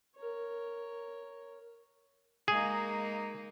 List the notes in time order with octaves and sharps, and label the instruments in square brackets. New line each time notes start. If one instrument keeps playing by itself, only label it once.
[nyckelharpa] A#4 C#5
[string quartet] G#3 A#3 D#4 [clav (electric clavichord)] G#4